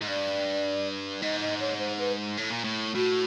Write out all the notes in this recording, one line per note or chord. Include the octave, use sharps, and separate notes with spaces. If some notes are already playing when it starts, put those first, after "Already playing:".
G#2
G2 D5
G#2 D#5
D#5
C#5
C5
B4
A2
A#2
A2
A2 F#4